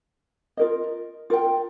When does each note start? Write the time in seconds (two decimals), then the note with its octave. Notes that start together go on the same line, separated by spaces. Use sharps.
0.57 F4 A#4 D#5
1.30 F4 A#4 G5